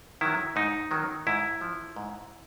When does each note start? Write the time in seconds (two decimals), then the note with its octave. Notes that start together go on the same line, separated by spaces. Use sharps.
0.21 D#3 F#3 E4
0.56 G#2 D#4
0.91 D#3 F#3
1.27 G#2 E4
1.61 F3
1.96 G#2